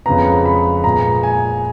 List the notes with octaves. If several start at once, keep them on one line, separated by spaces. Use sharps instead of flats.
F2 C#3 G#3 B3 A#5
B5
A#2 G#3 B3 A#5
G#5